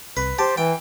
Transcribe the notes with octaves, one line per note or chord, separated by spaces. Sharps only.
C2 B4
G4 C5 A5
E3 G5